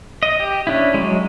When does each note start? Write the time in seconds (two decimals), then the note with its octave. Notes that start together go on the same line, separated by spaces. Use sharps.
0.23 D#5
0.40 G4
0.67 C#4 D4 E4
0.94 F#3 G#3